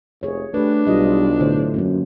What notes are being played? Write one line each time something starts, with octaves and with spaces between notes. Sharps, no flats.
F1 G#4 C#5
A3 D4 G4 B4
B1 G3 E4 F4 D#5
A2 D3 F#3 C5
F#2 F#3 A#3 C#4